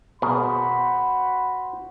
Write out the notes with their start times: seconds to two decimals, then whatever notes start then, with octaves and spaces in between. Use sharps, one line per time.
0.22 B2 F#4 G#4 A#4 C5 B5